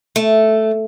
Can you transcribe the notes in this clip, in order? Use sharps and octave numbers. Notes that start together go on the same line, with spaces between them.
A3